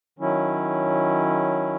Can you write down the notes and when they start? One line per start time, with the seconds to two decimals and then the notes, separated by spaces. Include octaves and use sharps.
0.19 D#3 F#3 C#4 E4